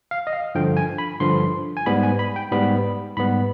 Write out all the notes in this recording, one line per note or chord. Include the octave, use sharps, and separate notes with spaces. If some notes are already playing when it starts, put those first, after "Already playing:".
F5
D#5
F5
G2 D3 F3 G5
G#5
B5
G2 D3 F3 C6
G#5
G#2 G3 B3 B5
G#5
B5
G5
G#2 G3 B3 B5
G#2 G3 B3 B5